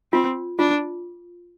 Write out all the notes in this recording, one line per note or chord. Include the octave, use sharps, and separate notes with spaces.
C4 F4
D4 F4